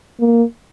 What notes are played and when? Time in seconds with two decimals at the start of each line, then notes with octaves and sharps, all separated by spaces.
0.20 A#3